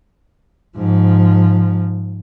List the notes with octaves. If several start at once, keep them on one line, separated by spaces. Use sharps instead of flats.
G#2 F3